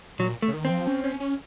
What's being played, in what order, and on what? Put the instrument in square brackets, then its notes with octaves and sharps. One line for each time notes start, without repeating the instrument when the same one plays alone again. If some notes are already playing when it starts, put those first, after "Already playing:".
[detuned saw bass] A#2 [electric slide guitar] F#3
[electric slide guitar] A3
[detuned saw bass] C#3
D#3
[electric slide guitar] C4
[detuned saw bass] F3
C#4
C#4
C#4